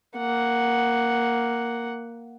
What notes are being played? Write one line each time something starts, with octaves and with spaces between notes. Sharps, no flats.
A#3 F#5